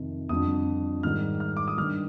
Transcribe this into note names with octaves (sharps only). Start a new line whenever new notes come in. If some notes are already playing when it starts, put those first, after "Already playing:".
Already playing: F2 C3 D#3
F2 D3 G3 D#6
G#2 D#3 G3 F6
F6
D6
D#6
G2 D#3 G3 F6